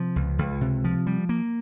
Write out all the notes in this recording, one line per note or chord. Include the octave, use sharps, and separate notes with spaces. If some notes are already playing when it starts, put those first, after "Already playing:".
Already playing: C3 F3
C#2
C#2
C3
F3
G3
A#3